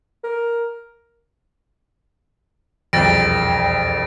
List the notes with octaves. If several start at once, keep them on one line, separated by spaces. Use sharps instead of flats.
A#4
E1 C2 F2 A6 A#6 D7